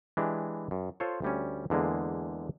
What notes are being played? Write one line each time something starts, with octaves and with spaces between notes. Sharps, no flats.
E3 G#3 D4 G4
F#2
F4 A4 C5 C#5
D2 G3 C#4
E2 D3 G#3 A#3 G#4